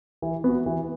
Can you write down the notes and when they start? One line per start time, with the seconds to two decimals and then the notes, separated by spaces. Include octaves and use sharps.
0.22 E3
0.44 B3 F#4
0.66 E3